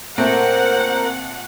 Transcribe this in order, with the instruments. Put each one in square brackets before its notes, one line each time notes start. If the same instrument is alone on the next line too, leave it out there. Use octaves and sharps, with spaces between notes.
[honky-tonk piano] A#2 A3 C4 [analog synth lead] A#4 [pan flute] C5 [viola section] F#5